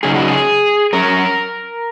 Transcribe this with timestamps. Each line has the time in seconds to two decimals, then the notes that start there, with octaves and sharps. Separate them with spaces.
0.03 C#3 F#3 D#4 G#4
0.16 F#4
0.28 G#4
0.93 F#2 F#3 C#4 A#4